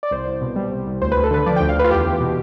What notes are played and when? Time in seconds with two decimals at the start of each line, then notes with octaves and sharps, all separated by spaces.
0.03 D5
0.11 C2 C5
0.27 C2
0.41 B2
0.56 G3
0.71 C2
0.87 C2
1.01 D2 C5
1.12 D2 B4
1.24 A4
1.31 D3 B4
1.46 F3 D5
1.56 D2 G5
1.69 F5
1.76 D2 B4
1.84 F4
1.90 E2 G4
2.06 E2
2.20 B2